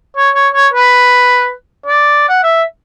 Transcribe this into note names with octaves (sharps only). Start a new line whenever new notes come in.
C#5
C#5
C#5
B4
D5
F#5
E5